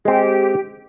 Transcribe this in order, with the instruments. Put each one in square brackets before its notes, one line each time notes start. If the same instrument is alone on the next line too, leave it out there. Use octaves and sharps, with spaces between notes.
[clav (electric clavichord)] G#3 C4 [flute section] G4